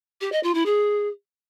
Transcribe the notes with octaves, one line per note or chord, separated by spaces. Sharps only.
G4
D#5
F4
E4
G#4